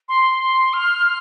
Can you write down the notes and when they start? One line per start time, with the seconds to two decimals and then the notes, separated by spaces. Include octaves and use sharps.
0.09 C6
0.41 C6
0.73 F6